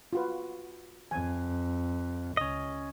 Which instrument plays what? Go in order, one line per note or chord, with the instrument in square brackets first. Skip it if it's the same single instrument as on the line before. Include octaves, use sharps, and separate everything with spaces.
[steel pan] F4 F#4 B4
[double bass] F2 [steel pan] G#5
[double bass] C#2 [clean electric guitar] C#4 D#5